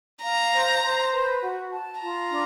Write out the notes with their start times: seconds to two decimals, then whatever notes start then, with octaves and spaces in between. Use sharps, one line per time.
0.23 F5 A#5
0.53 C5
0.82 C5
1.12 B4
1.42 F#4
1.72 A5
2.01 F4 A#5
2.31 D4